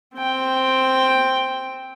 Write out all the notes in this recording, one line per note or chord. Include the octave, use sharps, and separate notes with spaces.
C4 G5